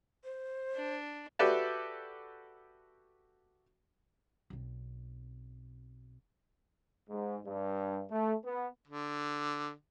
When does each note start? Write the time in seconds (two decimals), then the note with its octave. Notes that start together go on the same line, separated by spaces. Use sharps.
0.24 C5
0.75 D4
1.39 F#4 G4 A4 B4 D5 E5
4.50 B1 C4
7.09 G#2
7.45 G2
8.10 A3
8.44 B3
8.88 D3